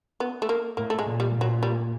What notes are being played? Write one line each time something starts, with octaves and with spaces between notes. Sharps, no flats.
B3
A3
A#3
A2 A#3
A3
G#3
A#2
G3
A#2
F#3
G3